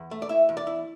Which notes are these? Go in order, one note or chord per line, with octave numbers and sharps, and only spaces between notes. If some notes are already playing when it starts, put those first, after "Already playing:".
Already playing: E2
A3
D5
E4 E5
E2
D5
E4